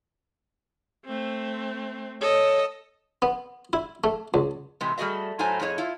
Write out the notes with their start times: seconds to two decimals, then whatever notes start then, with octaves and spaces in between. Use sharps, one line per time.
1.06 A3 C4
2.21 A4 C#5 D#5
3.22 B3
3.73 E4
4.04 A3
4.34 C#2
4.81 A2 C3 E3 G#3
4.98 G3 A3 F#4 G#4 D#5 E5
5.39 A2 F#3 A3 C5 G#5 A#5
5.60 F2 A2 G#4 C#5 D#5
5.78 E4 F4